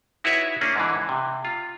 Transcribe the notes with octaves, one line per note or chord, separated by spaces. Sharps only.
D#4 E4 F#4 B4 C#5 E5
A#3 C#4 D4 G#4
G#2 D3 E3
C3
F4